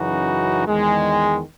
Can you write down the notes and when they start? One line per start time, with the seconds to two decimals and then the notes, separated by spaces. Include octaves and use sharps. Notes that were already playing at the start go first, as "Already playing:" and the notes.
Already playing: F#2 C#3 E3 D#4 F#4
0.67 E2 D#3 G#3